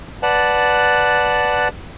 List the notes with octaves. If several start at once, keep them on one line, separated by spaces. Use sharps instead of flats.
B4 D5 F#5 A5